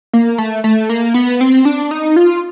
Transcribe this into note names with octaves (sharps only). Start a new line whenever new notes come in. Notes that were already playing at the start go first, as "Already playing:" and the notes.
A#3
A3
A3
A#3
B3
C4
D4
D#4
F4